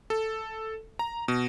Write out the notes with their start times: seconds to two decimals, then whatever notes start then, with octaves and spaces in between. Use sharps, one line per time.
0.10 A4
0.99 A#5
1.28 B2